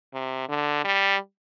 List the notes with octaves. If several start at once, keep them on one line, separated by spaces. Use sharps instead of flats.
C3
D3
G3